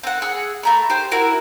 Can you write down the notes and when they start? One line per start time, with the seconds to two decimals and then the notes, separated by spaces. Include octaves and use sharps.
0.03 C4 F#5
0.22 G#4 F#5 E6
0.63 A3 A#5 B5
0.90 G4 C5
1.11 E4 F#4 A#4